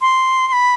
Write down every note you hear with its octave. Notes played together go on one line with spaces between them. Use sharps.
C6
C6
B5